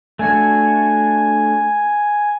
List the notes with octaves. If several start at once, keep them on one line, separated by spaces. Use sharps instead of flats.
A3 D4 F#4 G#5